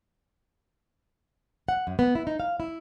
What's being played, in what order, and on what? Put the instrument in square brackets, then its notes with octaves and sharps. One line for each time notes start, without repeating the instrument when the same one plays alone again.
[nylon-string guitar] F#5
F#2
B3
E4
D#4
F5
E4